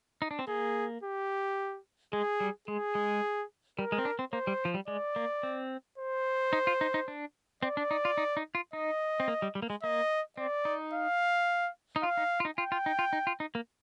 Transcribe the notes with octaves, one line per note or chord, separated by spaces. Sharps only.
D#4
D4
C4
A#3 G#4
G4
G#3 G#4
G3
G#3 G#4
G#3
G3 A#4
G#3
C4
D4
C4
A#3 C5
G3
F3
G3
G#3 D5
A#3
C4
C5
D#4
F4
D#4
D#4
D4
C4 D5
D4
D#4
F4
D#4
D#4
F4
D#4 D#5
C4
A#3
G3
G3
A#3
G#3
A#3 D#5
C4 D5
D#4
F5
D#4
F4 F5
D#4
F4
D#4
F4 G5
F4
D#4
F4
D#4
F4
D#4
A#3